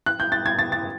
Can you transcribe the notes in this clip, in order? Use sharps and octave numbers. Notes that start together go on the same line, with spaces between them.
F#6
G6
A6
G#6
A6
A6